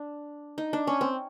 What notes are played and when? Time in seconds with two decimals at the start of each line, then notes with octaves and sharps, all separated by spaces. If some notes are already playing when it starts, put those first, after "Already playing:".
Already playing: D4
0.58 D#4
0.73 D4
0.87 C#4
1.01 C4